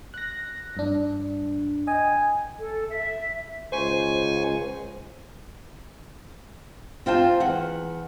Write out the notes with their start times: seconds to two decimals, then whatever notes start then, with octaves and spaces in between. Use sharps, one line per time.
0.14 F#6 A#6
0.77 G2 D4
1.87 D#5 G5 G#5
2.58 A4
2.89 E5
3.72 C#2 C5 G#5 C#6
7.06 C4 F4 G5 A5
7.40 E2 F#5